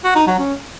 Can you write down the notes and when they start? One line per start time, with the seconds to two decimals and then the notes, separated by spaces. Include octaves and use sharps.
0.04 F#4
0.16 D#4
0.27 F#3
0.39 C#4